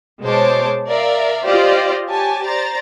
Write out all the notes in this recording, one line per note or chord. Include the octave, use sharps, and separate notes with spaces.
B2 G#3 C5 C#5 A5 D6
A#4 D5 E5 F5
F4 G4 C5 D5 D#5 F5
G4 C#5 G#5 A5
C5 D5 A#5 A6